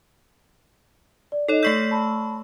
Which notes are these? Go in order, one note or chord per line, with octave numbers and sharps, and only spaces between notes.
D5
D#4 A4 C#5 D#5
A3 C#6 E6 G6 B6 C7
A5 B5